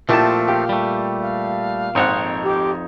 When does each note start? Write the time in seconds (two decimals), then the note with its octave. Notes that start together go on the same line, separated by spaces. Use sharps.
0.09 A#2 F3 A3 C4 E4 G4 A5
0.48 G4 F5
0.69 G3 A3
1.21 F5
1.95 G#1 F2 D#4 C5 C#5 F#5
2.44 G4